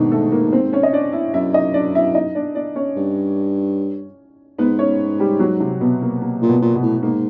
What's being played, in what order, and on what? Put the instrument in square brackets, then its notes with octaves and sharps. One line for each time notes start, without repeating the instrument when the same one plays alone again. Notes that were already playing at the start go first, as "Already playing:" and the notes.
Already playing: [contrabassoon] G#2 [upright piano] B2 D#3 A#3 B3 D4 D#4
[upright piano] A3 A4
A#3 A#4
C4 C5
C#4 C#5
D#5
D4 D5
E4 E5
[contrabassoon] F#2 [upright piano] E4 E5
[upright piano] D#4 D#5
D4 D5
E4 E5
D#4 D#5
D4 D5
D4 D5
C#4 C#5
[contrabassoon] G2
[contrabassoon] G#2 [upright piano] B3 B4
[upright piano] C#4 C#5
G3 G4
F#3 F#4
C3 C4
B2 B3
A#3
A#3
[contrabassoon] A#2
[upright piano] B2 B3
[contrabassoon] A#2
[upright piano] B2 B3
[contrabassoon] A2
[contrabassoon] G#2 [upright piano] A#3